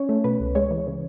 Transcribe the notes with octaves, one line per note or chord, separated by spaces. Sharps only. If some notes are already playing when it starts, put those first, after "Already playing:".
Already playing: C#4 C#5
A3
B2 B4
C#2
G#3 C#5
E3
C#3